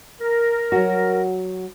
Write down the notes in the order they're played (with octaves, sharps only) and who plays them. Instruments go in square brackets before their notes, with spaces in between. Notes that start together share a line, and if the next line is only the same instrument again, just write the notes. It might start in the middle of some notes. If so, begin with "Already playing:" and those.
[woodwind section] A#4
[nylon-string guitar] F#3 F#4